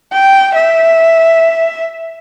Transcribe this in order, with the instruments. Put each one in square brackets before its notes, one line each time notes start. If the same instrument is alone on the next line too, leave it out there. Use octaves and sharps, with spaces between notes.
[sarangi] G5
E5